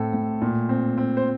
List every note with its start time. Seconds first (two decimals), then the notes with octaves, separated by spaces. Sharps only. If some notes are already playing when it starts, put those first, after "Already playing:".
Already playing: A2 C4 A4
0.13 A2
0.42 A#2
0.69 C4
0.97 C4
1.17 C5